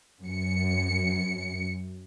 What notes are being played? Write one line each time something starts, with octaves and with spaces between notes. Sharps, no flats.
F#2 C#7